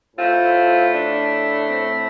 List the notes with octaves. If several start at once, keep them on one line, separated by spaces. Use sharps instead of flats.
A2 A3 C4 F4
D4
C4